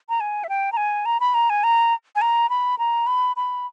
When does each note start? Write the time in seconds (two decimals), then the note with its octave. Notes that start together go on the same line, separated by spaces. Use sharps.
0.09 A#5
0.20 G#5
0.44 E5
0.49 G5
0.72 A#5
0.77 G#5
1.06 A#5
1.20 B5
1.34 A#5
1.50 G#5
1.64 A#5
2.16 G#5
2.21 A#5
2.50 B5
2.79 A#5
3.07 B5
3.36 B5